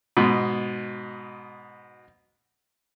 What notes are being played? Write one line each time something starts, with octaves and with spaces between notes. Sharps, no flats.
G#2 B2